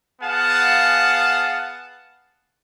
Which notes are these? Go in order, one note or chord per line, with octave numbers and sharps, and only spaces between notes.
B3 G#4 F5 F#5 A5